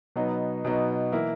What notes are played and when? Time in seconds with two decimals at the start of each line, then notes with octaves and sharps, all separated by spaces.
0.16 B2 F#3 B3 D#4
0.65 B2 F#3 B3 D#4
1.12 E3 A#3 E4